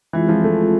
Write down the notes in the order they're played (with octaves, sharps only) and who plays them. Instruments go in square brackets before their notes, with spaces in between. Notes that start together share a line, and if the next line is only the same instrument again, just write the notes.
[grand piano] E3 [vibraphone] G#3 C4 F4 G#4
[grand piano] F3
A3